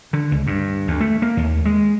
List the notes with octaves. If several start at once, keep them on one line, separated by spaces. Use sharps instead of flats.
D3
C#2
G2
D2
A3
A#3
D#2
G#3